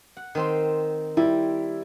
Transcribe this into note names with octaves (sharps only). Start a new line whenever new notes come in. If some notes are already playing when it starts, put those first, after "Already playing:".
F#5
D#3 C4 C6
G3 E4